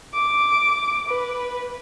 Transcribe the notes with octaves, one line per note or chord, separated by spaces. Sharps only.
D6
B4